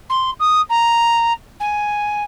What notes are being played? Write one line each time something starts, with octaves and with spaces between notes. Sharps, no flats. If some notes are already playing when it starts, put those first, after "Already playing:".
C6
D#6
A#5
G#5